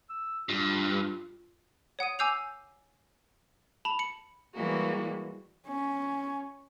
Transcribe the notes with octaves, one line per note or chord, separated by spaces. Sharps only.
E6
G2 F4
C#5 F#5 D#6 D#7
G#5 D6 E6 G6 C7 F7
A5 B5 F7 F#7
C#7 F#7
E3 G3 G#3 A#3 F#4
C#4